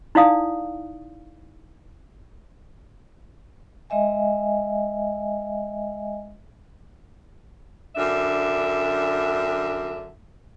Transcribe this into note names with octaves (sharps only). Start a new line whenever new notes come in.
D#4 E4 D5 F5 D#6
G#3 D#5 E5 G#5
F#2 D3 D4 E5